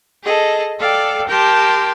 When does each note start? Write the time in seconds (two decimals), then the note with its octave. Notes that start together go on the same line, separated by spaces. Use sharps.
0.23 G#4 A4 D#5
0.79 A4 D5 F5 G5
1.28 G4 A#4 G5 A5 C6